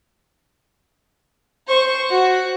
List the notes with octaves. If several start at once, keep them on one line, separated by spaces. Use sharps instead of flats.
C5 C#6
F#4